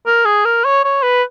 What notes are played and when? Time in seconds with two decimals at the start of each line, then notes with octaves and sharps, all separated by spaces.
0.07 A#4
0.26 G#4
0.45 A#4
0.65 C#5
0.84 C#5
1.03 B4